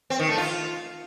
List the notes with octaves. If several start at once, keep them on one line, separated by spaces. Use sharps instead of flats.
C4
D#3
A3
F4